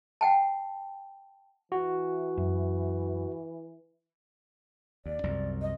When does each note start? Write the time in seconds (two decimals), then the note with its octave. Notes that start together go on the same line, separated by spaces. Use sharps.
0.21 F#5 G5 A5
1.72 E3 F#4
2.37 F#2
5.06 D#2 D5
5.24 C2 F#2
5.62 D#5